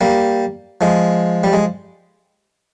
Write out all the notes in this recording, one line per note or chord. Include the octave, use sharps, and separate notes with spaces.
G3 A#3
F3 G#3
G3
G#3